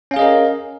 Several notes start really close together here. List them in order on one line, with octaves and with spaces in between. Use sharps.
C#4 F5 G#4 D#5 A#4